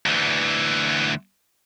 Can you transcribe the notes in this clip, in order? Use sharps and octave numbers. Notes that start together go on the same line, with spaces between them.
D2 E3